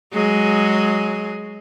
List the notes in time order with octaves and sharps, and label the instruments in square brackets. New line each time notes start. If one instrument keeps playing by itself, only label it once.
[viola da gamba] F#3 G#3 G#4